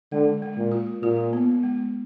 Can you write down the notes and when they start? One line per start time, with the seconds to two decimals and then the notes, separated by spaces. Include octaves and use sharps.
0.12 D3 G#3
0.42 G#3
0.57 A#2
0.72 F4
1.02 A#2 F4
1.33 B3
1.63 G#3